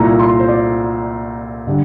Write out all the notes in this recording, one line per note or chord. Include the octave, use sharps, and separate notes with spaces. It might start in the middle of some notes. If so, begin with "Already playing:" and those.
Already playing: C2 A#2 A3 A#5
C6
C5
D5
D3 G3 D4